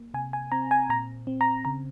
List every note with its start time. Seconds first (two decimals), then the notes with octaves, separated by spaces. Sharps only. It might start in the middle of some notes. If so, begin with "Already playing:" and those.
Already playing: A#3
0.14 C3 G#5
0.33 G#5
0.52 C4 A#5
0.71 G#5
0.90 A#2 A#5
1.27 C4
1.41 A#5
1.65 C#3 A#5